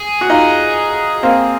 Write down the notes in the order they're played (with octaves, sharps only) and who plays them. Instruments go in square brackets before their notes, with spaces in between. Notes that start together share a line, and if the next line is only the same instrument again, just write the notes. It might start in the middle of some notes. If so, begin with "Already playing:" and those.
Already playing: [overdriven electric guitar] G#4
[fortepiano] F#4
D#4 F4
A#3 C4